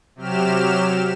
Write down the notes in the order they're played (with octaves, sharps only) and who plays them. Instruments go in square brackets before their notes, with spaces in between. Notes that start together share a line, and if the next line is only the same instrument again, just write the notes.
[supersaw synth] C3 F#3 G4 F6 E7